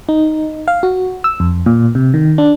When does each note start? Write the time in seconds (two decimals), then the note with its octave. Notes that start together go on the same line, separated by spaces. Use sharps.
0.09 D#4
0.68 F5
0.83 F#4
1.24 E6
1.40 F2
1.66 A#2
1.95 C3
2.14 D#3
2.38 D4